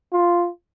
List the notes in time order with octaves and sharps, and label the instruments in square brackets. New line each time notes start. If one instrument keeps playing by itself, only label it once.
[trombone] F4